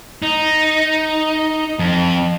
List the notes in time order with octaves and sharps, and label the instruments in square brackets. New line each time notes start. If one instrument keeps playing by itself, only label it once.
[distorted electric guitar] D#4
F2